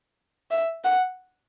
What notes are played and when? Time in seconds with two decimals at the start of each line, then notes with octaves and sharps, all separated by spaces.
0.51 E5
0.84 F#5